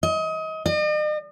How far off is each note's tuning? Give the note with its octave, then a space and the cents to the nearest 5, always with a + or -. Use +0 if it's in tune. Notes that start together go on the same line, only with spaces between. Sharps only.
D#5 +30
D#5 -45